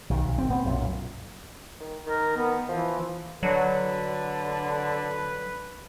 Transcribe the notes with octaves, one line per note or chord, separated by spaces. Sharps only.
B1 D#3
B1
G#1 C4
B3 C4
B1 F#2 A#2
D#3
D#3 A#4
B3
E3 F3
D3 F#3 B4